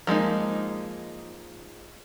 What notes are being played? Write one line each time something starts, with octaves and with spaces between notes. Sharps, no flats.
F3 G#3 A#3 D#4